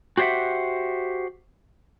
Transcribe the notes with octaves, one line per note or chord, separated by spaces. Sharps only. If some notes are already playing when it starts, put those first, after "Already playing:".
F#4 G4 C5 C#5 E5 F#5